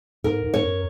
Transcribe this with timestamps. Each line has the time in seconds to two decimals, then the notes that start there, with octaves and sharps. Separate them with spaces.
0.24 G#2 A#4
0.44 G#2
0.54 C#5
0.63 F#2